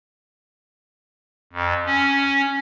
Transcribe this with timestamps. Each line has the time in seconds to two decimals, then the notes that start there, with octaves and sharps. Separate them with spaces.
1.53 F2
1.86 C#4